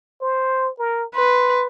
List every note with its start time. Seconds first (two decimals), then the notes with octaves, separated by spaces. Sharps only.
0.22 C5
0.79 A#4
1.15 B4 C6